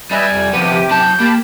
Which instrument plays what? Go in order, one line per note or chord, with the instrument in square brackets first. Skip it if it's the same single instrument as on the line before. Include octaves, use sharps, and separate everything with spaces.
[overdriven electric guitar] G3 [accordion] B4 D#5 E5 [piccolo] G#5
[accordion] F2 C3
[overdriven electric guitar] F2 B3 [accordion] C3 G4 [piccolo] D#7
[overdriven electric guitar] F#3 A5 [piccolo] G6
[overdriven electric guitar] A#3 [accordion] G4 A5 B5